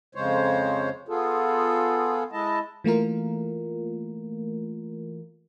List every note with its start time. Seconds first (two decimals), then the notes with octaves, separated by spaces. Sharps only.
0.15 F2 C#3 G#3 C5 C#5
1.09 B3 F4 G#4 A4
2.32 G#3 E4 D#5 A5
2.84 E3 A3 A#3 F4 A#4